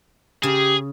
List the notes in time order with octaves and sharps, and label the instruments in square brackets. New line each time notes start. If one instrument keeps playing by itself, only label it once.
[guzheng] C#3 [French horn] G4 [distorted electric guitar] G#4